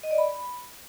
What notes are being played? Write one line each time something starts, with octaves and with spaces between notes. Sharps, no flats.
D#5
D5
B5